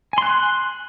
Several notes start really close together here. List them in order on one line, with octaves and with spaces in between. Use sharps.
G#5 C6 F#6